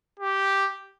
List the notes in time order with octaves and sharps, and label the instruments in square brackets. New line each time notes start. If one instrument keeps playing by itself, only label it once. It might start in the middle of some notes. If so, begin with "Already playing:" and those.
[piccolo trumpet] G4